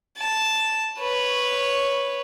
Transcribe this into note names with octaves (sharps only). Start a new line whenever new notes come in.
A5
B4 C#5